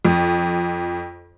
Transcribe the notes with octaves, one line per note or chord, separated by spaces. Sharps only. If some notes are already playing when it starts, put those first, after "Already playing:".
F2